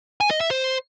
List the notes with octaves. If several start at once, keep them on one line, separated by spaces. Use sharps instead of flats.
G#5
D#5
E5
C5